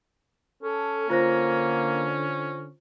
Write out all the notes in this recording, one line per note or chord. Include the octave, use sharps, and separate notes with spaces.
C#4 A4
D3 A#3 F4 C5 A#6